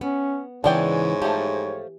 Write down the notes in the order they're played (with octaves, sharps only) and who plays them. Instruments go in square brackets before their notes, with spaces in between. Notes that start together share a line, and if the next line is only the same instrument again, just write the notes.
[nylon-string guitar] B3 [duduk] C#4
[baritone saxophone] G#2 [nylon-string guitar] C#3 E3 B3 [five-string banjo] D4 D5 G5 [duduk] C#5
[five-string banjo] F3 A3 [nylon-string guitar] G4